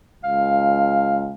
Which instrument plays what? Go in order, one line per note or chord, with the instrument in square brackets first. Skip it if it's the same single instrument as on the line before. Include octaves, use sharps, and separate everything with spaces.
[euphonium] C#2 [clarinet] F5